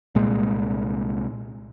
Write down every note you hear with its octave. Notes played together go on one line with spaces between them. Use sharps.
C2 A#2 G#3